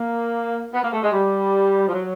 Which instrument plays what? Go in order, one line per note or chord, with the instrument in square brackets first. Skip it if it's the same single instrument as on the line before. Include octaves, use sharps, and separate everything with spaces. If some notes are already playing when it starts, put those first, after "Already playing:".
Already playing: [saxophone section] A#3
B3
A#3
A3
G#3
G3
F3
F#3